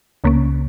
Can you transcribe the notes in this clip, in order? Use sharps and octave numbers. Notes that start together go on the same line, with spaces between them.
C#2 C#3 A#3 C#4